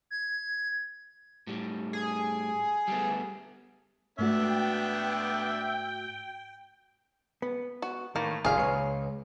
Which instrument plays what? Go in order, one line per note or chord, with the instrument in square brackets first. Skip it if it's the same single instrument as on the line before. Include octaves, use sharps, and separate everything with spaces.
[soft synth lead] G#6
[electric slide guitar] A2 G3
[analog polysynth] G#4
[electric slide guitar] G3 A3 B3
[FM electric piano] G#2 A3 F#4 [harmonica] B3 D4 E5 [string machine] G5
[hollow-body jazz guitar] B3
[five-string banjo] F#4
[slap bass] A2 [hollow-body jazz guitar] D#3 [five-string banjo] A#3
[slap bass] F#1 [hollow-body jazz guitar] D#2 A#2 [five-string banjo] G#4 F5
[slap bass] C#2 [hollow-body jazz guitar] B4 C#5